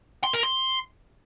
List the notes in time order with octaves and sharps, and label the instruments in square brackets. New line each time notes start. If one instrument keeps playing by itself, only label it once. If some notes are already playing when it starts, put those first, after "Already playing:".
[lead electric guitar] C6
A#4
C6